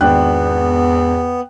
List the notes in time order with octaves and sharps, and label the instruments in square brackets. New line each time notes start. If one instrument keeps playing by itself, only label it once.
[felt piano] G#1 D4 F#6 [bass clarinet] E2 [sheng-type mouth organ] B3 [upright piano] G5